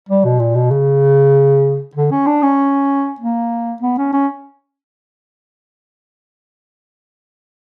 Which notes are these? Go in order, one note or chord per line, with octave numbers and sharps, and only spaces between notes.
G3
B2
A#2
B2
C#3
D3
C#4
D4
C#4
A#3
B3
C#4
C#4